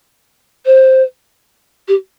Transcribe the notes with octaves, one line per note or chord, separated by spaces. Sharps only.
C5
G4